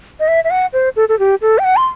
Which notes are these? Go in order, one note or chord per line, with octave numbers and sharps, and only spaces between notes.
D#5
E5
E5
F#5
C5
A4
A4
G4
A4
G5
F#5
C6